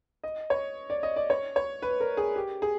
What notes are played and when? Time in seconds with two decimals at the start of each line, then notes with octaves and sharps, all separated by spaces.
0.24 D#5
0.50 C#5
0.90 D5
1.03 D#5
1.16 D5
1.30 C#5
1.56 C#5
1.82 B4
2.00 A#4
2.17 G#4
2.36 G4
2.62 G#4